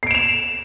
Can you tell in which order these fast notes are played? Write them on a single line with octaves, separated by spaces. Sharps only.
C7 D7 E7 F7